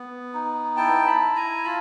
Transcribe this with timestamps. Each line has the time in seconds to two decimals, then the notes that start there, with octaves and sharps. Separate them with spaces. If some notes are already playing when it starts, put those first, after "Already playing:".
Already playing: B3
0.34 D#4
0.77 E4 G5 A5
1.07 A5 B5
1.22 E4
1.36 G#5 A#5
1.64 F4 A5 B5